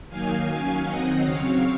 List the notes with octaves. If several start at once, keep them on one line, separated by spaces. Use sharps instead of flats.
D#3 F#3 A#3 D#4 F5 G#5
D#3 F#3 C#4 F5 G#5
D#3 F#3 C4 D#4 D#5 F#5
C#3 F#3 C4 C#5 F5